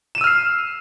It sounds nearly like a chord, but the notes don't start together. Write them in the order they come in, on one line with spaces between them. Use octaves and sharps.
E7 D#7 E6 F6 C7